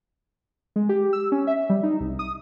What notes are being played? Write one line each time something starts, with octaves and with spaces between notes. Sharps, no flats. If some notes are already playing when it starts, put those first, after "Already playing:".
G#3
G4
E6
C#4
E5
G3
D#4
C2
D#6